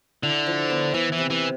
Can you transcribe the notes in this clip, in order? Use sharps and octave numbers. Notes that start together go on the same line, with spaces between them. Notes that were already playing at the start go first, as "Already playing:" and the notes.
D3 E4
F3
B3
E3 B3
E3
C3
E3